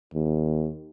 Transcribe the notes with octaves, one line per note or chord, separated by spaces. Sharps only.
D#2